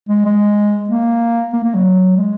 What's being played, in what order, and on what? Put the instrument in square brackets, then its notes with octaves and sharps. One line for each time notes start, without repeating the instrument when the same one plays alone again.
[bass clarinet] G#3
G#3
A#3
A#3
A#3
F#3
G#3